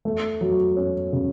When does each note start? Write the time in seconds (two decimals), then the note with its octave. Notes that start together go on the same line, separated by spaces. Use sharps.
0.05 A3
0.41 F#3
0.77 C#4
1.13 C#3